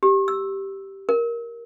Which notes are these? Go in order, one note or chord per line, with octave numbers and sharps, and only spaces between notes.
G4
E6
A#4